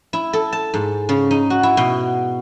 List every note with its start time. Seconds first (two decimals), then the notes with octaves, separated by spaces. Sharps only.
0.13 E4
0.33 A4
0.52 A5
0.74 G#2
1.09 C#3
1.31 D#4
1.50 F#4
1.63 E4
1.77 B2